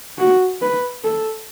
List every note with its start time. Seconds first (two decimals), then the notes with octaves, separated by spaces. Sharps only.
0.18 F#4
0.61 B4
1.04 A4